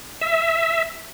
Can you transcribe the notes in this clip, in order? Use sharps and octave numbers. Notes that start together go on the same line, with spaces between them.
E5